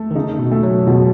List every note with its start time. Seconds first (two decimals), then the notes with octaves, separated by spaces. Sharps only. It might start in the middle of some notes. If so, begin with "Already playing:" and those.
Already playing: A3
0.11 D#3
0.15 C#3 D#4
0.39 B2
0.51 A3
0.63 F#3
0.87 B2 G#3